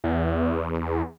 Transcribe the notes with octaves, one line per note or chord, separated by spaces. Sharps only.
E2